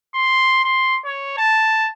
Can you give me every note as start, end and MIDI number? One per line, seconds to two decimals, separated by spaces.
0.15 0.63 84
0.65 0.97 84
1.05 1.33 73
1.37 1.89 81